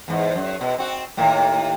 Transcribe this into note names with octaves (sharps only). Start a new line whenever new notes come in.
E2 G#2
F#2
B2
C4 F#4
D#2 A2 A#3